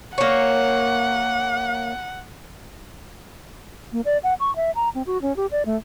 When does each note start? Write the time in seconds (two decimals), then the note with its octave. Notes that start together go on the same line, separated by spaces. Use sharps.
0.18 A#3 C#5 F#5
3.92 A#3
4.05 D5
4.23 F#5
4.40 C#6
4.56 E5
4.75 A#5
4.95 C4
5.06 F#4
5.22 C#4
5.37 G4
5.51 D5
5.65 A3